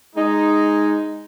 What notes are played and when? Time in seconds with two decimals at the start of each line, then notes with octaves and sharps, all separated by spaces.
0.16 G#3 D#4